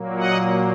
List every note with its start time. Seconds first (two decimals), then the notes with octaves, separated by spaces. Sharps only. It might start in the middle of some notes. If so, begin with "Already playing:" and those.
Already playing: A#2 F#3 A#3
0.17 D#5 F#5